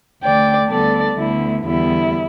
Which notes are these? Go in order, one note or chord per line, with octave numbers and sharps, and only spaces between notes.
D2 D3 A3 D5 G5
D2 D3 G3 B3 A4 D5
D2 D3 B3 E4
E2 D3 G3 B3 E4